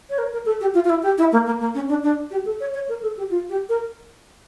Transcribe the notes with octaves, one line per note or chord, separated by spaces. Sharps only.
C#5
A#4
A#4
A4
G4
F4
F4
E4
G4
E4
A#3
A#3
A#3
C#4
D4
D4
G4
A4
C#5
C#5
A#4
A4
G4
F4
G4
A#4